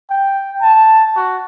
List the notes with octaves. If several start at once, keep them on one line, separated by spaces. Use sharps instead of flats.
G5
A5
F#4